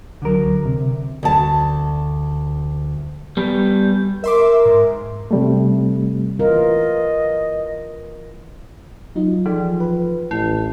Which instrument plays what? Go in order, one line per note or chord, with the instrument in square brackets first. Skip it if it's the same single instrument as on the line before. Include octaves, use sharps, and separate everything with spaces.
[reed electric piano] C#2 F#3 [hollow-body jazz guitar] D3 A#4
[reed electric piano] C3
[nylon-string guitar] D2 A5
[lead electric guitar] G3 B3
[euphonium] A#4 [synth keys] E5 C6 D6
[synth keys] G#2
[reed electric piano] C3 G3 A3
[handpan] E3 F4 A#4 [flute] D#5
[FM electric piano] F#3 D#4 F4
[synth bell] E3 [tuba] F3 [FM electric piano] G#4 D5
[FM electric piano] B4
[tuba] A1 [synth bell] E4